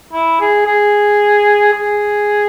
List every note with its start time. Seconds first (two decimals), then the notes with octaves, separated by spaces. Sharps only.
0.13 E4
0.41 G#4
0.66 G#4
1.73 G#4